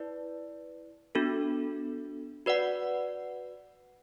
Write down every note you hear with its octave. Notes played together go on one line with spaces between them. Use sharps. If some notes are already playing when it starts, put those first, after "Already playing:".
Already playing: E4 B4 D5
B3 D4 F#4 A4
F#4 B4 D5 F#5